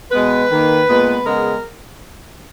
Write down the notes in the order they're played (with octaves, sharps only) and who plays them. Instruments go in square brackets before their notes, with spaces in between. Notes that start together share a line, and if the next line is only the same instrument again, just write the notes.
[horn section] B2 G#3 B3 B4
D#3 A#3
A#2 G#3 B3
C#3 G#3 B3 A#4